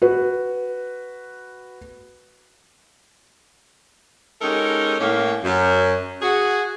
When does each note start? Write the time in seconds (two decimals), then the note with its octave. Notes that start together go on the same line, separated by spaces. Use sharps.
0.02 F#4 B4
4.42 G#3 C#4 D#4 G4 A4 A#4
5.00 A2 A#3 C#4
5.44 F#2
6.22 F#4 G#4